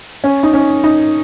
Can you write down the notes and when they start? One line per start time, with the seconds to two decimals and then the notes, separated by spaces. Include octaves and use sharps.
0.24 C#4
0.43 D#4
0.54 C#4
0.84 D#4